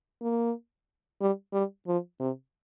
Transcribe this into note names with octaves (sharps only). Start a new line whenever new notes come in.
A#3
G3
G3
F3
C3